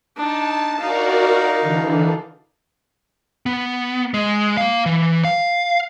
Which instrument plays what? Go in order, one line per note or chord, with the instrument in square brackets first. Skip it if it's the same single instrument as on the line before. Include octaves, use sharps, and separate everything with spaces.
[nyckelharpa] D4 D#4 [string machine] A5
[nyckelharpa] D#4 F5 [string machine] F#4 A#4 D5
[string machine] D3 E3 D4
[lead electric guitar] B3
G#3
A#3 F5
E3
F5